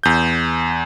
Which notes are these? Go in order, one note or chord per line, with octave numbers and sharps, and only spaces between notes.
E2 G6